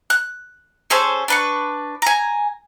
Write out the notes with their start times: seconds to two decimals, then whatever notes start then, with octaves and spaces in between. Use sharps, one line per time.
0.10 F#6
0.90 C#4 G#4 A4 C5
1.28 D4 B4 C#6
2.02 G#5 A#5